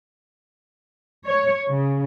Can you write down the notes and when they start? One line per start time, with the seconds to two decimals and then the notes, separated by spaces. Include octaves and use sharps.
1.27 C#5
1.68 C#3